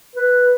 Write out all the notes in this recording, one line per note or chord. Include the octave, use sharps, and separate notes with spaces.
B4